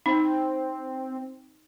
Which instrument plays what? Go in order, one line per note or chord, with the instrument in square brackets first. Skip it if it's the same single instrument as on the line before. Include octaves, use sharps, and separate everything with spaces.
[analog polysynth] C4 [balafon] D#4